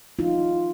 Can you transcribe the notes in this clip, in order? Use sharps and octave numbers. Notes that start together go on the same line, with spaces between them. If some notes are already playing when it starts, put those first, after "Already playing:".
D#4 F4